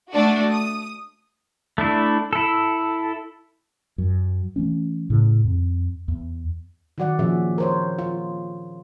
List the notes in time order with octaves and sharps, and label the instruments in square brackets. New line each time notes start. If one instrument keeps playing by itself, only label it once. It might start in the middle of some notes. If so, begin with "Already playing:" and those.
[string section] A3 D4 F#4
D#6
[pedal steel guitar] A3 D4 E4
E4 A4
[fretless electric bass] F#2
E3 A3 C#4
A2 C#3
F2
E2
[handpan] D#3 F#3 F#4 D5 F#5
A#2 F3 C#4 G#4 E5
A#4 C5 C#5
F4